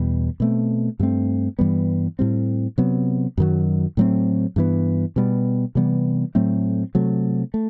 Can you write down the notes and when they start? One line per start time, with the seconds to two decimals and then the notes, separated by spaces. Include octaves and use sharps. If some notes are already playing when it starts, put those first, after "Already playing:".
Already playing: E2 B2 G3
0.40 B2 A3 C4
0.99 G2 F#3 A3 C4
1.59 G2 E3 G3 B3
2.19 A2 G3 C4
2.78 C3 F#3 B3
3.38 F#2 D#3 F#3
3.97 A2 F#3 A3 C4
4.56 G2 E3 B3
5.16 B2 G3 B3
5.75 C3 E3 G3 B3
6.35 A2 F#3 A3 C4
6.95 C3 F#3 A3
7.54 A3